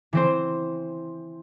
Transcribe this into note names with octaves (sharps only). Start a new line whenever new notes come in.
E3 C4 C5